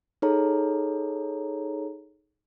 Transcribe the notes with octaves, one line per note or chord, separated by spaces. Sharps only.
D#4 G#4 A4 C#5 A#5